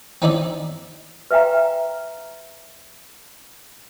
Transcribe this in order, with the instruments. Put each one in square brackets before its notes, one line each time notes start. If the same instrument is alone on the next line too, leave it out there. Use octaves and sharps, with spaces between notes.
[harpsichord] C4 C#4 D#4 E4 D5 E5
[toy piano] B4 E5 F5 G5 A#5